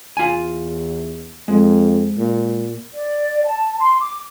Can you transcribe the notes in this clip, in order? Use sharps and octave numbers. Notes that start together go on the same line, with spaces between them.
E2 F4 G#5
F2 G#3
A#2
D5
A5
C6
D6